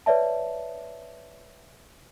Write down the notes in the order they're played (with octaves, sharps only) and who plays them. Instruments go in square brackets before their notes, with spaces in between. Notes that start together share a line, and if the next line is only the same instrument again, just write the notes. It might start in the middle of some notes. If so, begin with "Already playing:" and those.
[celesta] B4 C#5 D5 E5 A5